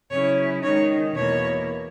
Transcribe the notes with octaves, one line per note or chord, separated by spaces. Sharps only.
C#3 F#3 C#4 E4 C#5
D#3 G#3 D#4 C#5
E2 B2 A#3 E4 C#5